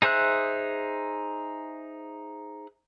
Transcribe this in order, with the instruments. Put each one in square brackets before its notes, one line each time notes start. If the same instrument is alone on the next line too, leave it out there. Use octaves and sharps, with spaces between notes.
[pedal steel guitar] D#4 G#4 C5 E5 F#6